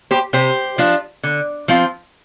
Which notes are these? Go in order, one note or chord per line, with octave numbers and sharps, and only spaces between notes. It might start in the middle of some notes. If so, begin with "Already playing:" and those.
G4 C5
C3 G4 C5
F3 D4 F4
D3
F3 C4 F4